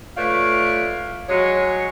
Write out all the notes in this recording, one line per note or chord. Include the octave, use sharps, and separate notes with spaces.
A3 F4 B4 C#5 D5 F5
F#3 G#3 C#5